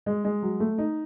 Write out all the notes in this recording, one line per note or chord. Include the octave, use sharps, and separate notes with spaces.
G#3
G#3
F#3
A3
D#4